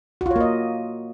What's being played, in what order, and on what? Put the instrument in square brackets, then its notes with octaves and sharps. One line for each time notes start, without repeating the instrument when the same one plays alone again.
[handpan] F#4
F4
C#5
A#3
D#5